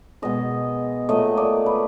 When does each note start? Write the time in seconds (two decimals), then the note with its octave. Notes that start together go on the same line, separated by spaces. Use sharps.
0.22 B2 G#3 D#5
1.09 A#2 F#3 A3 D#5
1.37 D5
1.66 B4